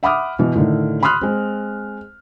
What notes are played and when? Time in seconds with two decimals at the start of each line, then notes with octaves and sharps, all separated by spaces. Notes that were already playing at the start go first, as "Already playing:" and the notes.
0.03 E5 F#5 B5 D6 D#6 F6
0.39 B2 E3
0.55 A2 D3 D#3
1.03 B5 C6 D#6 F6 F#6
1.21 G#3 C4